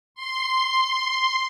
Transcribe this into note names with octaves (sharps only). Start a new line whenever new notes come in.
C6